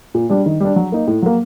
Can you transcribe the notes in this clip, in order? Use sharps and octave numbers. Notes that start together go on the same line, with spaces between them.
A#2
G3 D4
D#3
G3 D4
F#3
A#3 D#4
A2
F#3 A#3